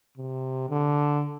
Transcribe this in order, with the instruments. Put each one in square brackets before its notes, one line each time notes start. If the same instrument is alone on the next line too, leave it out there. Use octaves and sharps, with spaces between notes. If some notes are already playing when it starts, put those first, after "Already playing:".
[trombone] C3
D3